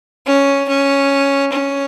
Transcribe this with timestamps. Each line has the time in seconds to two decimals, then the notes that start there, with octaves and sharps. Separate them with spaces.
0.26 C#4
0.69 C#4
1.52 C#4